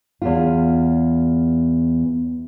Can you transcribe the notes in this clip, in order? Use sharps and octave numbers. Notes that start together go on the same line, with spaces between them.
E2 B3 F4